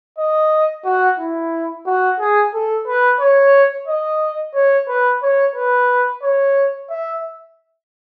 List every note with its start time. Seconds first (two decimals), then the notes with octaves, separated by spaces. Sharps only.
0.18 D#5
0.85 F#4
1.19 E4
1.86 F#4
2.19 G#4
2.54 A4
2.87 B4
3.20 C#5
3.88 D#5
4.54 C#5
4.89 B4
5.23 C#5
5.56 B4
6.23 C#5
6.90 E5